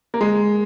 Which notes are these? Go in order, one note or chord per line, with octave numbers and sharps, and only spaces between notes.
A#3
G#3